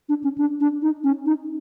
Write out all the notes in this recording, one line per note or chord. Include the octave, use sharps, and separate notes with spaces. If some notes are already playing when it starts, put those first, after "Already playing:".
D4
C#4
D4
D4
D#4
C#4
D#4